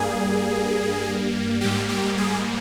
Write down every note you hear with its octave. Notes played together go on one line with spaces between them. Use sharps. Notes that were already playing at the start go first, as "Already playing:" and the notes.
Already playing: G2 G3 A#3 G#4
G#2 G3 A#3 G4
G4
G#4